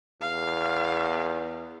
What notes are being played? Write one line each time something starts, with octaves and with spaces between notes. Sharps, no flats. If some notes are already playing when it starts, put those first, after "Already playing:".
E2 F5